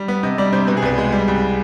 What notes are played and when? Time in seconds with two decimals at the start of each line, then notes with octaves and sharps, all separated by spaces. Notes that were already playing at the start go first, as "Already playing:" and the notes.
Already playing: G3
0.08 B3
0.23 C3 D#5
0.38 G3 D5
0.53 C3 C5
0.67 B2 B4
0.77 G#4
0.82 C2 B4
0.98 G#3
1.12 G3
1.28 C2